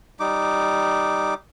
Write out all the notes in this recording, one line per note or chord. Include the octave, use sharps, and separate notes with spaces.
G3 D#4 D6